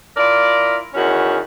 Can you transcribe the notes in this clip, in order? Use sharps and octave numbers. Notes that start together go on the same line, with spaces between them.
E4 F4 A#4 D5
E2 D#3 C#4 F#4